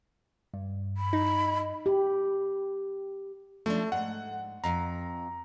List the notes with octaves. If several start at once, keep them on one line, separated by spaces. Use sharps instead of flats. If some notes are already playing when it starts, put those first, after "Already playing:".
G2
B5
D#4
G4
F3 A3 C#4 D4
G#2 F#5
F2 A#5